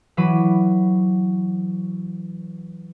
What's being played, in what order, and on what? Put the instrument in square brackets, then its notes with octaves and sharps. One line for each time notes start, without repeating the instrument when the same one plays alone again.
[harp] E3 F#3 B5 D6 D#7